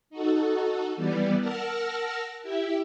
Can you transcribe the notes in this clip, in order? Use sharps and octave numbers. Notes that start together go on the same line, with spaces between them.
D#4 F#4 A4
E3 G3 B3 D5
A#4 F#5 A5 E6 F6 A#6
E4 G4 E5